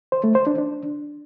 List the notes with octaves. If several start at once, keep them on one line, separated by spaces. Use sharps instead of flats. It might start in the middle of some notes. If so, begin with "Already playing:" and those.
C5
A3
C5
D4
D4